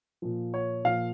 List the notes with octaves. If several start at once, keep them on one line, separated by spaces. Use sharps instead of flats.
A#2 F3
C#5
A#2 F3 F5